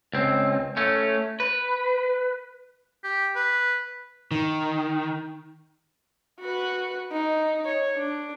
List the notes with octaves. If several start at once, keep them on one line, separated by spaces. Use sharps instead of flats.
C#2 C4
A3 C#4
B4
G4
B4
D#3
F#4 B4
D#4
C#5
D4